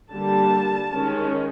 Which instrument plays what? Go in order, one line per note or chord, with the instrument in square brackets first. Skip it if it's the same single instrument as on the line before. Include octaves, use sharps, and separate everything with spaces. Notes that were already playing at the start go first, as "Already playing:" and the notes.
[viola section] D3 G3 A#3 A5
D#3 G#3 C#4